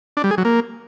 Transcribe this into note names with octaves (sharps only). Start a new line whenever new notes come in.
D4
G3
G#4
F#3
A#3